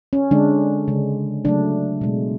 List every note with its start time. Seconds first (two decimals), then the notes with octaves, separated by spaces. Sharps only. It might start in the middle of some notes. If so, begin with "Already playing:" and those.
0.13 C#4
0.31 D3 G#3 D4
0.88 C#3 G#3
1.45 C#3 F#3 A3 D4
2.01 B2 G#3